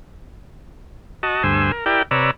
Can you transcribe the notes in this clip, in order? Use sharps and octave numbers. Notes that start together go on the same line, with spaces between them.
F#4 D#5 A5
D2 G2 C5 G#5 E6
A#4
E4 G4 A#4 D5 G5
C3 B4 C#5 D5 A#5 E6